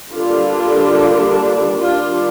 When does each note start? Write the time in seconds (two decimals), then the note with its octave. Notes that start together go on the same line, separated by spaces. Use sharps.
0.11 D3 G3 A#3 D4 F4
1.78 D#3 G3 D4 F4